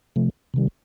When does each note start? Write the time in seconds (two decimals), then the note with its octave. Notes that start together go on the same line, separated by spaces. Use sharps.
0.16 C3 F3 A3
0.54 C3 D#3 G3